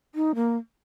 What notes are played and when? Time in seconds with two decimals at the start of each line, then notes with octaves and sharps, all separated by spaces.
0.15 D#4
0.35 A#3